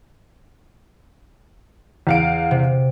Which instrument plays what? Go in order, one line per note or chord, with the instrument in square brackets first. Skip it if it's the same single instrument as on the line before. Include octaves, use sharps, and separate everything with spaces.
[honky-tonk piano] E2 F5 D7
[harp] C3